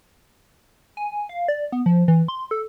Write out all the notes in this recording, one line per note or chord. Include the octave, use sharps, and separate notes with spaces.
G#5
F5
D5
B3
F3
E3
C6
A4